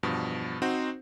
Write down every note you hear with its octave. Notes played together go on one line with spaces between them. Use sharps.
E2 G2 B2 F3
C4 D#4 F#4 C5